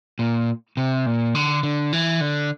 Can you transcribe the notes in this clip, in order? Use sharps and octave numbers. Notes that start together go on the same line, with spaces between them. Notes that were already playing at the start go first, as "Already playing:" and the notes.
A#2
C3
A#2
D3
D3
E3
D3